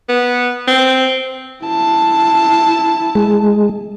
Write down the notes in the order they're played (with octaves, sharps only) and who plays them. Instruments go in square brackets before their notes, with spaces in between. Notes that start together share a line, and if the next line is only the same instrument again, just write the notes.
[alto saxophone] B3
C4
[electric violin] E4 A5
[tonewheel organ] G#3